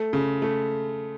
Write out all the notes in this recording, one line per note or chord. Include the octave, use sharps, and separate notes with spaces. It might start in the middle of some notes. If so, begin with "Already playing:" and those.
Already playing: A3
C#3
A3